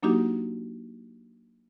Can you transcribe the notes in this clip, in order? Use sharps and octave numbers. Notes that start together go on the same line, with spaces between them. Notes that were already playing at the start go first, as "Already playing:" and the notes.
F#3 A#3 D4 D#4 F#4 G4